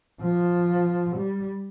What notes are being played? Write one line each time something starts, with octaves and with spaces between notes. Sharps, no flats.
F3
G3